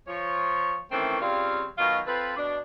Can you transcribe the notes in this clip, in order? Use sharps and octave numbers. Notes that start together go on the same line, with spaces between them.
F3 C#5
D#3 E3 A3 C4 C#4
C#3 G3 C4 F4 F5
B2 D#3 F#3 F4
C4 F4 A4 B4
B2 D4